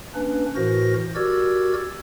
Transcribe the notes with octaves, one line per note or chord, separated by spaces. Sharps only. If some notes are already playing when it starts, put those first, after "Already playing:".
A#3 C#4 D4 B4
A2 E3 F#4 A#4 C5 A#6
F#4 G4 A#4 D5 E6 G#6